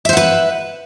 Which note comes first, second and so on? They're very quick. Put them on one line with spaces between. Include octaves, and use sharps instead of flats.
E5 C5 F#5 B4